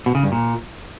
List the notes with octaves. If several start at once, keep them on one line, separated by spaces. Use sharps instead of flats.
B2
C#3
G2
A#2